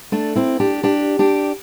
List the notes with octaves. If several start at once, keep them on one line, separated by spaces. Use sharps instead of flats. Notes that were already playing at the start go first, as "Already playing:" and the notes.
A3 D4
C4 E4
D4 G4
D4 G4
D4 G4